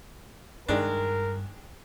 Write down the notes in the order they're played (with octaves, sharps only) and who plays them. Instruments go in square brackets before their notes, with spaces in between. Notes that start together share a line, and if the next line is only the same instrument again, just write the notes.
[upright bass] G2 [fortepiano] D#3 G#3 D4 [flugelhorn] A#4